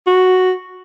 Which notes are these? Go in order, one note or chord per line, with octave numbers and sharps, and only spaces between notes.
F#4